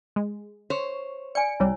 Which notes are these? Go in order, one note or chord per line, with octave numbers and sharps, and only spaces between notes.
G#3
C5 C#5
D5 G#5 C#7
C2 G3 E4 C#5